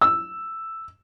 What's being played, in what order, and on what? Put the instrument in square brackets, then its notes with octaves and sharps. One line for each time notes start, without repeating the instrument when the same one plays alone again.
[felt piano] E6